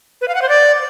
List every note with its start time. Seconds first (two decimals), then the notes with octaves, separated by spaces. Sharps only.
0.21 B4
0.28 F5
0.35 F#5
0.42 C5
0.49 D5